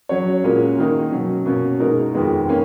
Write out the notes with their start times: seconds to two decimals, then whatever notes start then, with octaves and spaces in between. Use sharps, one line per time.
0.09 F#3 C#4 F#4 C#5
0.44 A#2 G#3 C#4 F#4 A#4
0.78 D#3 A#3 D#4
1.12 B2 F#3 C#4
1.46 B2 A#3 C#4
1.80 B2 G#3 D#4 A#4
2.13 F2 D#3 G#3 B3
2.48 D#3 A#3 C#4